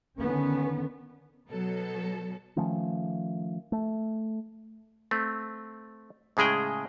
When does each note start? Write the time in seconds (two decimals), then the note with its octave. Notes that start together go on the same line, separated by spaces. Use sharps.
0.19 D3 D#3 B3 C#4
1.50 B2 F#3 A4
2.56 D#3 F3 A3 C#4
3.72 A3
5.11 A3 C4
6.37 A2 C#3 G#3 G#4 G5